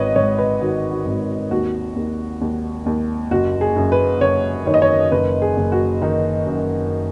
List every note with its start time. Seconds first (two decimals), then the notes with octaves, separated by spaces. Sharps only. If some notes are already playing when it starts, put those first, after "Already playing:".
Already playing: G#1 B4 C#5 D#5
0.16 G#2 C#5
0.38 B4
0.61 D#3 F#4
0.91 F#4
1.06 G#1
1.51 D#2 F#4
1.96 D#2
2.41 D#2
2.86 D#2
3.31 F#1 F#4
3.61 G#4
3.76 F#2
3.92 B4
4.21 F#1 C#5
4.66 D#3 C#5
4.74 D#5
4.82 C#5
5.12 F#1 B4
5.42 G#4
5.57 F#1
5.72 F#4
6.02 D#3 D#4
6.46 F#2